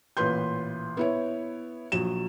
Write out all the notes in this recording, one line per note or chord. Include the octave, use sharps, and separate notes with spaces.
A1 A#2 B4 C6 G6
B3 E4 C#5
A#1 F#3 E7